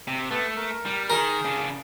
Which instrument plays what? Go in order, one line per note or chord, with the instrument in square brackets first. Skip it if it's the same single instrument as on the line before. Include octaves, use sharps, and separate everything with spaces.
[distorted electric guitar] C3
[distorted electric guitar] A3 [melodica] B3 F#5 A5
[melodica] A#4
[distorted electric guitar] G3
[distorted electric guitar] D#3 [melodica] G#4 [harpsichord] A#4
[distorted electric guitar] C#3 D4